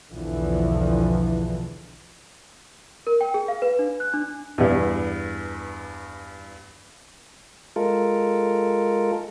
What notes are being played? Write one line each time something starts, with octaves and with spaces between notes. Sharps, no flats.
B1 E2 D3 E3 F3
A#4
G5
G#4
F5
B4
D4
F#6
D4
E2 G2
G#3 F4 A4 A#4